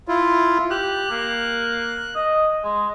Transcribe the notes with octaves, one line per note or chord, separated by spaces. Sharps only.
E4 F4
G4 F#6
A#3
D#5
G#3